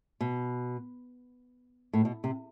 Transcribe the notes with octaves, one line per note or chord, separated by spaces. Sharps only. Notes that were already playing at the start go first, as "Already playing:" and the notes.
B2
A2
B2
C3